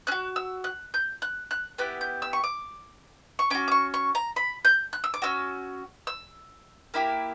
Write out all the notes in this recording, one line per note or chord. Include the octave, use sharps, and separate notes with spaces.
C#4 F#4 F#6
E6
F#6
G6
F#6
F#6
B3 E4 G4 F#6
G6
E6
C#6
D6
C#6
C#4 F#4 D6
D6
C#6
C#6
A#5
B5
G6
F#6
E6
D6
C#4 F#4 E6
E6
A#3 E4 G4